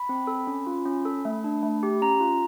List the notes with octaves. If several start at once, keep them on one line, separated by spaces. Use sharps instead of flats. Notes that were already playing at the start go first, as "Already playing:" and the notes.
Already playing: B5
C4
A4
C#4
F4
C#4
A4
A3
D4
A3
G4
C#4 A#5
F4